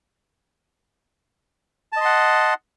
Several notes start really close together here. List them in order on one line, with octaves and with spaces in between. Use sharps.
A5 D#5 C6 F#5